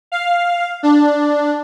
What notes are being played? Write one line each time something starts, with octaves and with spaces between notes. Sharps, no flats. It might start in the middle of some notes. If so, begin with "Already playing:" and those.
F5
D4